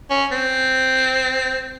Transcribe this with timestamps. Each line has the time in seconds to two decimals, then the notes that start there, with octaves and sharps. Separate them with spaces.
0.10 C#4
0.31 C4